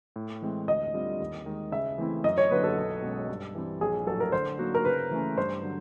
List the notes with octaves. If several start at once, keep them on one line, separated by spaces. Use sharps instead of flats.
A2
E3 G#3 C4
D2 D#5
D3 G3 C4 F4
D#2
D#3 G#3
C#3 E5
E3 A3 C4 E4
F#2 D#5
C#5
D3 F#3 A#3 B4
A4
B1
B2 G#3 C#4
G2
E3 G3 C4
A#1 G#4
A2 F#3 A3 A4
A#4
D3 C5
F#3 A#3 D#4 F#4
A#4
C#3 B4
E3 A3 C#4
G2 C5
D3 F#3